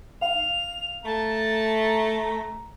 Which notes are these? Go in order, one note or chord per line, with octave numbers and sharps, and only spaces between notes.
F5 F7
A3 A5 A#5